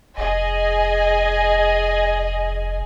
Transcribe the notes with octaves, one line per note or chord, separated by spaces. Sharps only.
F1 G#4 D#5 G#5